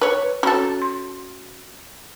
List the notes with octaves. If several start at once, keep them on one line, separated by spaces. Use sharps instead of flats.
B4 C#5
F#3 C#4 A4
C6